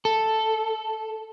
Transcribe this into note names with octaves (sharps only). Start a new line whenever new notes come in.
A4